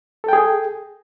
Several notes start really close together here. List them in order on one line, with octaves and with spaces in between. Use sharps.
A4 G5 G#4